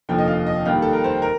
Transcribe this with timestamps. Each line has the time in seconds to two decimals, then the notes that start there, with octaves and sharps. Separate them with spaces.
0.09 F1 D#2 D3 F3 G5
0.18 D#5
0.28 F5
0.47 D#5
0.65 D#2 D#3 G3 F5
0.82 A4
0.93 A#4
1.04 C5
1.22 A#4